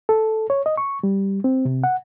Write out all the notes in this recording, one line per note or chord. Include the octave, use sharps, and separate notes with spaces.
A4
C#5
D#5
C#6
G3
C4
C3
F#5